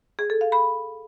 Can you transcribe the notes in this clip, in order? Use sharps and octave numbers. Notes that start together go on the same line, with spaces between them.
G#4
A4
F5
B5